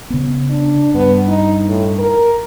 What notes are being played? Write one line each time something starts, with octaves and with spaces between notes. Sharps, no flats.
C#3 B3
D4
G2 B3
D#4
A2
A#4